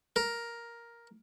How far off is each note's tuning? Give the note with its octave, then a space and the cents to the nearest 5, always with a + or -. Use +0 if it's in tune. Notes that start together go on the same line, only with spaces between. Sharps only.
A#4 +5